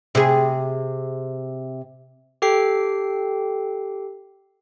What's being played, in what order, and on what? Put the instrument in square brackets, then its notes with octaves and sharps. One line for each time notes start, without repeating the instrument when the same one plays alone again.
[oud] C3 G#4
[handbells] G4 A4 G5 C7